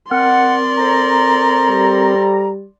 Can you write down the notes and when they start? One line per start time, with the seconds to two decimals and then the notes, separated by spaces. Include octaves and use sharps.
0.11 C4 A#4 D5 F#5 C6
0.77 A4 C5 A#5
1.70 G3